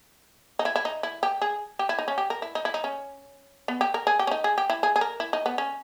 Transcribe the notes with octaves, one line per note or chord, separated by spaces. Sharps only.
D#4
E4
E4
D#4
E4
G4
G#4
G4
E4
D#4
C#4
G4
A#4
E4
D#4
E4
D#4
C#4
B3
G4
A#4
G#4
G4
C#4
D#4
G#4
G4
E4
G#4
G#4
A#4
E4
D#4
B3
C#4